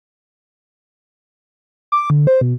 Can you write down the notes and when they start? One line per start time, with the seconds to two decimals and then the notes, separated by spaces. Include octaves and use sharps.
1.92 D6
2.10 D3
2.27 C5
2.41 B2